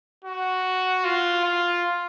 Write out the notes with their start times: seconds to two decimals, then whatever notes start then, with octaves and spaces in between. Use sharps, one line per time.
0.25 F#4
1.04 F4
1.45 F4